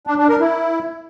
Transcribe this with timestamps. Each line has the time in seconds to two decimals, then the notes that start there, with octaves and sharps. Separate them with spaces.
0.07 D4
0.18 D4
0.29 A#4
0.40 E4